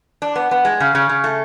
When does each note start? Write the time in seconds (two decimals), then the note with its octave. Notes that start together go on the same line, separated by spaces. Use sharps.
0.22 D4
0.36 B3
0.51 B3
0.65 G#3
0.80 C#3
0.95 C#3
1.09 C#3
1.24 A3